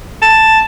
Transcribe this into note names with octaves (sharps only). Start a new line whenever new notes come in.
A5